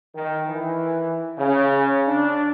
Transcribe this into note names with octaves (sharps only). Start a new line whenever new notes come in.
D#3
E3
C#3
D4